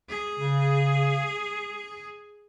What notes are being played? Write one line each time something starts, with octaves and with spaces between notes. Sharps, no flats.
G#4
C#3